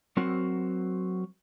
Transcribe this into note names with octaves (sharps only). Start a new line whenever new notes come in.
F#3 C4 F#4 A#4 C5